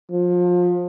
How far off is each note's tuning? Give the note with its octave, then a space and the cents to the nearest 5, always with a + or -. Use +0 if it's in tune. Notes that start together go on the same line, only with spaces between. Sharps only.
F3 +25